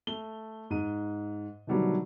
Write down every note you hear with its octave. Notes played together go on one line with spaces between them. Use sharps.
A3 G7
G#2 D#7
B2 D3 D#3 F#3 G3 A3